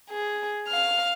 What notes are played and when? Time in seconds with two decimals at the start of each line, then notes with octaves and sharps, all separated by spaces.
0.10 G#4
0.68 F5 F6